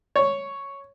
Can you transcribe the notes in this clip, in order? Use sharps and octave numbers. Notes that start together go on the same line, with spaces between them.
C#5